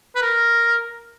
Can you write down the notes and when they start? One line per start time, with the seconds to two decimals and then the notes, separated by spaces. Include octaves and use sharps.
0.15 B4
0.22 A#4